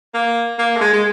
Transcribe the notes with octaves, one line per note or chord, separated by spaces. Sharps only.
A#3
A#3
A3
G#3
G#3